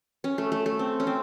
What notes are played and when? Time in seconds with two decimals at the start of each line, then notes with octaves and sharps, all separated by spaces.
0.24 C#4
0.38 A3
0.52 A3
0.66 A3
0.79 C4
1.00 C#4
1.07 C4